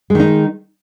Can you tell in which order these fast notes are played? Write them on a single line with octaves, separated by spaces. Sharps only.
G#3 D#3 D#4